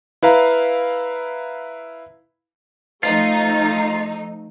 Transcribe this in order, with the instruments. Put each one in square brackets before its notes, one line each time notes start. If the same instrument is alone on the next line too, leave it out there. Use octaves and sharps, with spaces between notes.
[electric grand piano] E4 B4 F5 A#5
[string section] F3 A3 D#4 [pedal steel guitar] F4